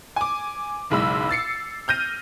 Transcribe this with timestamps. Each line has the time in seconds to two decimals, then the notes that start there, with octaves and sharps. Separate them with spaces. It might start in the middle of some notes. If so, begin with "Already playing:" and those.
0.16 G#5 D6
0.90 F#1 B1 G#3 B5 E6
1.29 E6 A6 C7 C#7
1.88 F6 G6 A#6 D#7